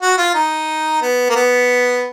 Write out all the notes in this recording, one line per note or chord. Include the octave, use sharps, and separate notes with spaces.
F#4
F4
D#4
B3
A#3
B3